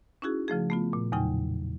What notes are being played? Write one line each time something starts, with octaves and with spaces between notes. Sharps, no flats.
C#4 D#4 E4 F#4 G#4
C#3 F3 A3 G#4
A3 B3 F4
A#2
E2 A2 C#3 F#3 D#4 G5